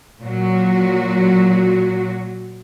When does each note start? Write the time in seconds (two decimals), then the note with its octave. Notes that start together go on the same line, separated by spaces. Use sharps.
0.21 A#2 F#3 F#4